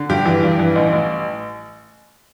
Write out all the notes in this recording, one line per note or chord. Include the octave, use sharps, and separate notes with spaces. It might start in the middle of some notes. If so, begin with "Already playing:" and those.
Already playing: D3
G2 G4
E3
G2
E3
A1
A1